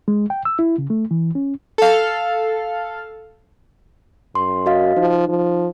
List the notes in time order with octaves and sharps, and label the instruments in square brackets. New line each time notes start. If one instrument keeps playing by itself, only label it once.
[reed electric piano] G#3
G5
E6
E4
C#3
A3
E3
C#4
[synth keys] A4 F5
[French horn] F#2 [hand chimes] C6
[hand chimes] F#4 D#5 F5
[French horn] F3 [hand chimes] D#4
[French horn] F3